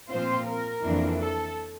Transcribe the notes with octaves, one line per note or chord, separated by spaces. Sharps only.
A#2 F3 C4 F4 C5
A#4
F2 E3 A#3 D4
A4